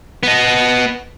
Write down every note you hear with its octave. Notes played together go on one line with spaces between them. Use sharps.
B3 D#5